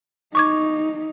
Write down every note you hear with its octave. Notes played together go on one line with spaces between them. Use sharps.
D#4 C#6 D6 G#6